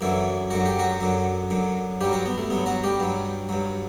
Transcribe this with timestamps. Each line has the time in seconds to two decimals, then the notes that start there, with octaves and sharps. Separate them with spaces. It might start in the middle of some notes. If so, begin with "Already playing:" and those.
0.01 F#2 D3 E3 F#3 E4
0.51 F#2 D3 F#3 F#4
0.66 G4
0.79 F#3 F#4
1.00 F#2 D3 F#3
1.50 F#2 D3 F#3
2.01 G2 F#3 G3 G4
2.12 F#3 F#4
2.26 B3
2.38 A3
2.50 G2 F#3 B3
2.66 F#3 F#4
2.84 G3 G4
3.00 G2 F#3
3.49 G2 F#3